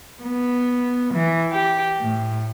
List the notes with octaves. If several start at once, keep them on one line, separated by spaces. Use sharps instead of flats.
B3
E3
G4
A2